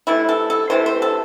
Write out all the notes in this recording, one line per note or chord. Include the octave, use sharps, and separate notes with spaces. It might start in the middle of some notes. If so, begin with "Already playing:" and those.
C3 E3 A3 E4
A4
A4
C3 E3 A3 C5
C5
A4